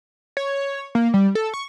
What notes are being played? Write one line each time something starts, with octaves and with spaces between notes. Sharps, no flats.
C#5
A#3
G3
A4
C#6